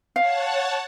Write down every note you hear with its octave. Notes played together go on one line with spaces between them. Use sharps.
C#5 F5 F#5 A5